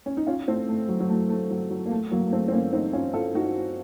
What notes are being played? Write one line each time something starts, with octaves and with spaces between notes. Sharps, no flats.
C#4
D#4
C#4 F4
A3 C4
A3
F#3
F#3
A3
A3
F#3
F#3
A#3
A3
F#3 A#3
A#3
A3 C4
C4
A#3 C#4
C4 D#4
C#4 F4
F4 A4
D#4 F#4